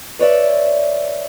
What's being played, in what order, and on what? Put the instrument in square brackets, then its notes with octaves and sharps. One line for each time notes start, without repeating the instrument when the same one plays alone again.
[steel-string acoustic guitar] B4 C#5 D5 E5